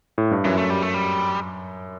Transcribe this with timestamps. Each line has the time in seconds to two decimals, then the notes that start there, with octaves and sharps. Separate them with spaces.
0.18 A2
0.31 G2
0.44 F#2 E3
0.58 A3
0.70 G3
0.82 A3
0.94 G3